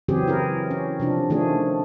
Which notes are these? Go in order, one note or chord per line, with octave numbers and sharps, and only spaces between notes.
C#3 E3 F#3 C4 G4 G#4
E4 G#4 A#4
C#4
C3 F3 D4
D#3 F3 A3 C#4 D4 G#4